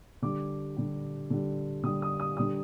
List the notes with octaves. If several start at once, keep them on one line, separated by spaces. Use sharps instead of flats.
D3 G3 D6
D3 G3
D3 G3
D3 G3 D#6
D#6
D#6
D3 G3 D#6